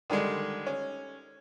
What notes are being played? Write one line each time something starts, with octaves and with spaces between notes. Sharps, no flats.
D3 D#3 G3 G#3
C#4